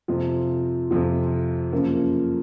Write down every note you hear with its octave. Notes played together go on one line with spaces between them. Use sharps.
F2 C3 F3
F2 C3 F3
F#2 C#3 F3 A#3